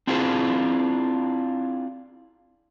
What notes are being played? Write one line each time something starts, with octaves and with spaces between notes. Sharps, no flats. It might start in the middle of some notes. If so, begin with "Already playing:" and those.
C4 D4 E4 F4 G#4 C5